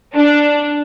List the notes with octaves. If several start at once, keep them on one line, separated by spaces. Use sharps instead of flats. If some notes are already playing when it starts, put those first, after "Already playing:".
D4